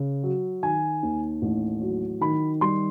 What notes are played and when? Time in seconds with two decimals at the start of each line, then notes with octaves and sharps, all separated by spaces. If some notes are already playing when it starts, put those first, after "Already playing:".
Already playing: C#3
0.23 F#3
0.63 D#3 G#5
1.03 D#2
1.42 A1
1.81 F#3
2.21 D#3 B5
2.61 G3 C6